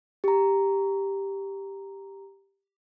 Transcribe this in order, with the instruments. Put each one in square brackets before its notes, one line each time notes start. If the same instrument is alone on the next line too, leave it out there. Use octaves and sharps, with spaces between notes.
[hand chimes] G4 A#5